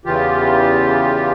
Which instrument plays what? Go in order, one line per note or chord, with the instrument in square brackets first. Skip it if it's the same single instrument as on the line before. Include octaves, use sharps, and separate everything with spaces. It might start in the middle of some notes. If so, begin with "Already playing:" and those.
[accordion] E2 C#3 E3 F4 G4